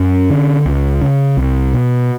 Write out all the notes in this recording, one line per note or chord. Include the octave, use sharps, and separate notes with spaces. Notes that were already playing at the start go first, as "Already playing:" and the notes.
Already playing: F#2 C#4
D3
C#2
C#3
C2
B2